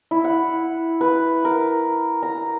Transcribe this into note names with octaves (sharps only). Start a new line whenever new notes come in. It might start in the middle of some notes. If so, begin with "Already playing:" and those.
E4
F#5
B4
A#4
A#5